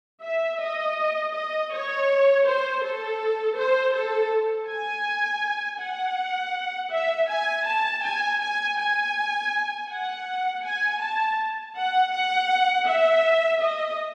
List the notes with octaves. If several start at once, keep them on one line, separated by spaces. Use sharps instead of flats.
E5
D#5
D#5
C#5
C5
A4
C5
A4
G#5
F#5
E5
G#5
A5
G#5
G#5
G#5
F#5
G#5
A5
F#5
F#5
E5
D#5